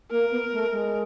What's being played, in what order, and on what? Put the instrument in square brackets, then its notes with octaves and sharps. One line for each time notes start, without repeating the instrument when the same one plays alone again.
[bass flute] A#3 [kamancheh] A#4
[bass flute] B3
A3
G#3